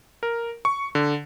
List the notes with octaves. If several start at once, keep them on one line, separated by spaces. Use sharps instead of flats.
A#4
C#6
D3